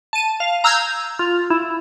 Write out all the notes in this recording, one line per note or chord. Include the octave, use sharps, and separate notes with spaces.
A5 D#7
F5
A#5 E6 F6 G6 G#6
F4
E4